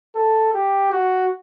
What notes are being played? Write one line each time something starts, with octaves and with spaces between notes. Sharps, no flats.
A4
G4
F#4